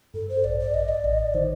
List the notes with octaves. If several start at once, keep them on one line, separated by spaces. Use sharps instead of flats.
G2 A4
C5
A1 D5
D5
A1 D#5
D5
A1 D#5
D5
D#3 C5